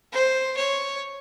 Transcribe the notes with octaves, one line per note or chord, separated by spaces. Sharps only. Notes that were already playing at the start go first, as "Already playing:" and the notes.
C5
C#5